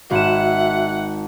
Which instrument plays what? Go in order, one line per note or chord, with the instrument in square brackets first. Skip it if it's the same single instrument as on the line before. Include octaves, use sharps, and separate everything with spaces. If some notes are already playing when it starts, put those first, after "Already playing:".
[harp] G#1 E7 [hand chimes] F#4 [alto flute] E5 [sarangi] F#5